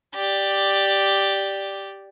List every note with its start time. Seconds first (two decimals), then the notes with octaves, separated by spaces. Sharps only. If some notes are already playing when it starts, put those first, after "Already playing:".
0.15 G4 D5